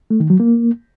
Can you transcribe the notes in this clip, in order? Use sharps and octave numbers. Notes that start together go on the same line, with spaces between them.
A3
D#3
F#3
A#3